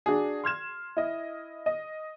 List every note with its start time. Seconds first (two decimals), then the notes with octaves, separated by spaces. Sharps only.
0.06 D4 F#4 G#4
0.44 C6 F6 G#6 E7
0.97 E4 D#5
1.66 D#5